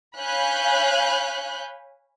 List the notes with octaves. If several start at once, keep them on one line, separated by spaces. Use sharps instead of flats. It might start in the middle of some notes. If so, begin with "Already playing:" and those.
C#5 F5 G#5 B5 F#6 G6